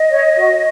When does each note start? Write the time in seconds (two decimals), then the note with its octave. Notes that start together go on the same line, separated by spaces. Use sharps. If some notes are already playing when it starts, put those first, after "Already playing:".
Already playing: D#5
0.10 C#5
0.37 F#4